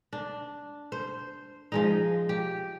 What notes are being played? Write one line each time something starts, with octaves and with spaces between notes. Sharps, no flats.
D4
C5
F3 G#3 D#4
G4